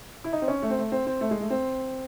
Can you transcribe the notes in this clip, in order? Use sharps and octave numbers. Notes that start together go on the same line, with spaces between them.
E4
D#4
C4
C#4
A3
C4
A3
C4
C4
A3
G#3
A3
C4